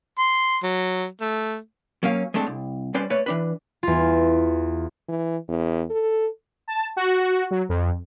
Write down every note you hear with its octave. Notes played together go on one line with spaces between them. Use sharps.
C6
F#3
A3
F#3 A#3 C#4 F5
G#3 A3 C4 D4 A4
C2
G3 C#4 B4 C5 D5
A3 B4 C#5 D5
E3 D4 B4
E2 F4
E3
E2
A4
A5
F#4
F#4
F#3
F2